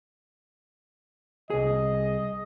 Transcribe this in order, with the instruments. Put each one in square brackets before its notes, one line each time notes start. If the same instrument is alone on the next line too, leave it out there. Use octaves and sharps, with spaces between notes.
[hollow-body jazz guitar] C2 G#4 [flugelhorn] D#5